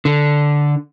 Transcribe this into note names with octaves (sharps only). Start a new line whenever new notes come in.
D3